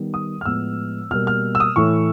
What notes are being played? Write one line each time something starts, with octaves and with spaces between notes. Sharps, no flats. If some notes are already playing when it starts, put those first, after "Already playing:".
Already playing: D#3 G3 B3
D#6
F6
A2 F3 G#3 B3 E6
B2 G3 A#3 F6
F6
E6
D#6
A2 E3 A3 C#6